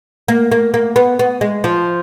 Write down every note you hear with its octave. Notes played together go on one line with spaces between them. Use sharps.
A#3
A#3
A#3
B3
B3
G#3
F3